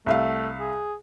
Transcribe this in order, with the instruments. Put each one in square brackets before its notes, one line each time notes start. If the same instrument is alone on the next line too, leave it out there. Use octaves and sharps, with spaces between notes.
[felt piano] C2 E5 F5 [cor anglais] A3
[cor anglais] G#4